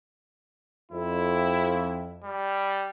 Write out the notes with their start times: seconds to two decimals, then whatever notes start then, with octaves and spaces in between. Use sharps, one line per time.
0.91 F2 E4
2.24 G3